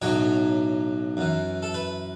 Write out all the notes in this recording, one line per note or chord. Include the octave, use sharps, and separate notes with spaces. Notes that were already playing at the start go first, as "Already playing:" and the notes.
B1 A2 F#3 C#5
F#2 E3
A4
B4